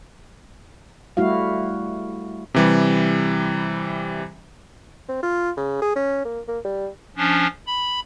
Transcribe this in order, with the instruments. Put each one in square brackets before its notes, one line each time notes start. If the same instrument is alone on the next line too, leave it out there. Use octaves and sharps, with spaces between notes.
[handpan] G3 A3 E4 F#4 F5
[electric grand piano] C3 E3 G3
[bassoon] C4
F4
C#3
G#4
C#4
A#3
A#3
G3
[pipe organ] F3 C#4 D4
B5